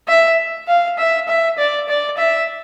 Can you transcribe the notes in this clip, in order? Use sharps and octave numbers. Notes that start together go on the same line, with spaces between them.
E5
F5
E5
E5
D5
D5
E5